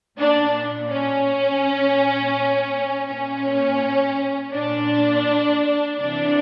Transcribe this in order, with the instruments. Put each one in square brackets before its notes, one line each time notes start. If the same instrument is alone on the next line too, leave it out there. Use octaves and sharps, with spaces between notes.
[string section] A#2 D4
C#4
A#2
A#2 C#4
A#2 D4
C3 E3 D4